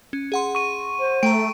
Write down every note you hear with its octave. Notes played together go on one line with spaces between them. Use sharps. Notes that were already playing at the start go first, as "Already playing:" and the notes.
C#4
G#4 F#5 C6
C#6 D#7
C5
A3 G5 A#5 D7